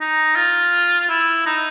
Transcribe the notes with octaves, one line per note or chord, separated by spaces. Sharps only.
D#4
F4
E4
D#4